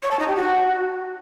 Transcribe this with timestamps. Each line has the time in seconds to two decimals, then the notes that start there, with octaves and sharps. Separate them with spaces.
0.03 C#5
0.11 A5
0.19 D#4
0.28 G4
0.36 F#4